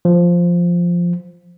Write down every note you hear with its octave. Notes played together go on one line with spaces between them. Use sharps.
F3